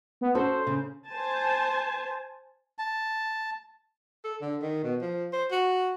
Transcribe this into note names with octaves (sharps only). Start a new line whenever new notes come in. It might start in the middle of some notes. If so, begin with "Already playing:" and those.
B3
C#4 F#4 A4 C5
C#3
C5 G#5 A5
A5
A4
D3
D#3
B2
F3
C5
F#4